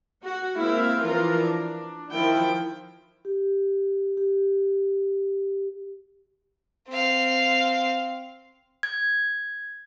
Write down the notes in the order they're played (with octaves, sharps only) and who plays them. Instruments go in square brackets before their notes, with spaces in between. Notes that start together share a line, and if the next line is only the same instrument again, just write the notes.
[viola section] F#4 F#5
G#3 A#3 C4 E4 E5 F5
E3 F3 F4 A#4 F5 A#5
D4
D#3 F3 E4 G5
[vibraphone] G4
G4
[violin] C4 F5
[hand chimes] G#6